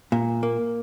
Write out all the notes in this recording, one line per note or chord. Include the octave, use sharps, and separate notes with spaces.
A#2
A#3